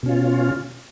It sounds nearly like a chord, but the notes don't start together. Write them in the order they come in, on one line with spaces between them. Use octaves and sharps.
B2 C#4 F4